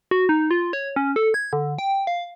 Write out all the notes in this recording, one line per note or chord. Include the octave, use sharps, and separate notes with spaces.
F#4
D#4
F4
C#5
C#4
A4
G#6
D3
G5
F5